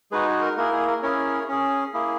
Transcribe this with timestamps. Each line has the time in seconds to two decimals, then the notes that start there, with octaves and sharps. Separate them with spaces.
0.12 G#3 D#4 F#4 G#4 B4
0.27 G#4
0.42 A#4
0.57 A#3 E4 G#4 A#4
0.72 G#4
0.87 A#4
1.03 C#4 E4 G#4 A#4 C#5
1.48 C#4 G#4
1.94 A#3 E4 G#4